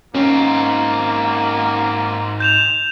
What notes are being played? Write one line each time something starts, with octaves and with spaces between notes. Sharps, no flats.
G#2 A#3 C4 C#4
G6 E7 F7